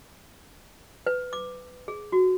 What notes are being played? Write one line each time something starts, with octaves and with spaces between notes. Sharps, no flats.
B4
D6
G#4
F#4